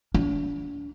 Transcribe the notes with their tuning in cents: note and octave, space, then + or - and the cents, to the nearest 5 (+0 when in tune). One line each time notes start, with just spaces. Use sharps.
D4 -40